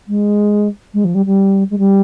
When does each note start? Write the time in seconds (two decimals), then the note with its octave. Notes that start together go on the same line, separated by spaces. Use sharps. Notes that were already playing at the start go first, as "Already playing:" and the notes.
0.08 G#3
0.94 G#3
1.05 F3
1.15 G3
1.26 G3
1.70 G#3
1.78 G3